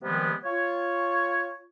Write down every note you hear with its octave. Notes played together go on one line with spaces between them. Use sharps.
C3 D#3 F3 G3 G#3 B3
F4 C#5